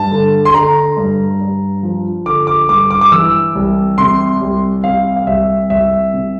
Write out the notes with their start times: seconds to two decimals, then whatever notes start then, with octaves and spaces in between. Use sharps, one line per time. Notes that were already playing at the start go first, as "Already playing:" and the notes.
Already playing: G2 A5
0.11 D3
0.45 C6
0.54 D3 A#5
0.97 G2
1.40 G2
1.83 F3
2.26 D3 D6
2.47 D6
2.69 G2 D6
2.91 D6
3.01 D6
3.12 E3 E6
3.55 C2
3.98 C3 C6
4.41 C2
4.84 C3 F5
5.16 F5
5.27 C2 E5
5.70 C2 E5
6.13 C3